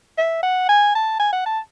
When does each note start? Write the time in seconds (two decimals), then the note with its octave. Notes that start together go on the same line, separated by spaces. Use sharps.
0.18 E5
0.43 F#5
0.69 G#5
0.95 A5
1.19 G#5
1.33 F#5
1.46 A5